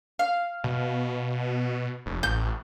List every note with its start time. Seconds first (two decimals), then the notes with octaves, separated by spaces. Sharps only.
0.19 F5
0.64 B2
2.06 F1
2.23 A1 G6